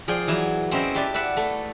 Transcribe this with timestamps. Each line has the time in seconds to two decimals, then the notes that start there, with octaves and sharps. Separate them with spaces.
0.08 F3 G#4 D5 G5
0.28 E3 F#3 E4
0.71 C4 C#4 E4 D#5 G5
0.95 G4 B4 D5 E5 A5
1.14 B4 D5 E5 F#5
1.37 A3